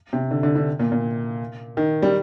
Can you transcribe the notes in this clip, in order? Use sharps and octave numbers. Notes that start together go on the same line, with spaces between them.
C3
D3
D3
D3
A#2
A#2
D#3
G3